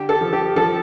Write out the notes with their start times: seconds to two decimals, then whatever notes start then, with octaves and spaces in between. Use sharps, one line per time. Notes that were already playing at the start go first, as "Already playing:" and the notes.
Already playing: D3 G4
0.09 A4
0.21 F3
0.33 G4
0.56 F3 A4